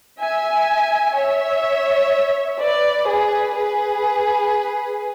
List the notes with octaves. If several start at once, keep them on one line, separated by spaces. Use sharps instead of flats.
E5 G#5
C#5 E5
B4 D5
G#4 B4
G#4 B4